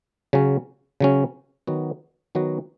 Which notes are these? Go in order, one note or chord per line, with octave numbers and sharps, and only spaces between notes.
C#3 F#3 C#4
C#3 F#3 C#4
D#3 F#3 B3 F#4
D#3 F#3 B3 F#4